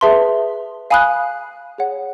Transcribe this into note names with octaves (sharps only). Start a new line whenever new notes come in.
G#4 B4 E5 A5 C6
F5 G#5 B5 D#6 F#6
G#4 C#5 F#5